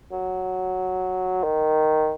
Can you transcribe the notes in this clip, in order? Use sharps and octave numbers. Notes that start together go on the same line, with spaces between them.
F#3
D#3